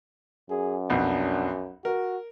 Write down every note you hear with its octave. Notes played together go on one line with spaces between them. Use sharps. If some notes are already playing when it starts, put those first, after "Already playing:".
F#2 G#4
B1 F2 D4
F#4 A#4